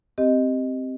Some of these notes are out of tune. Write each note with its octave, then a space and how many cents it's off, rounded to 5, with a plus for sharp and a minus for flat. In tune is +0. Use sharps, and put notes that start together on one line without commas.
C4 +0 G4 +0 D#5 +0